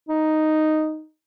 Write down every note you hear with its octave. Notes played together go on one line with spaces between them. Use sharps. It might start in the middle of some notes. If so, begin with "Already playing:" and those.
D#4